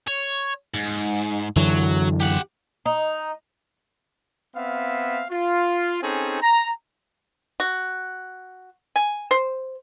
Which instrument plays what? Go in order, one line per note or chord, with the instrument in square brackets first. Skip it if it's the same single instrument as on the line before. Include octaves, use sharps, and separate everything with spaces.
[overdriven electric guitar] C#5
G#2
[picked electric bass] F#2 D3 E3 [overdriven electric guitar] F#3
[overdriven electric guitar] G4 F#5
[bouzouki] D#4
[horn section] B3 C4 E5 F5
F4
C4 C#4 D#4 G#4 A4
A#5
[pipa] F#4
G#5
C5